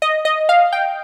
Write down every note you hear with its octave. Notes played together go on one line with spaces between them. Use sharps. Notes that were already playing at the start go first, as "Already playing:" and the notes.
D#5
D#5
F5
G5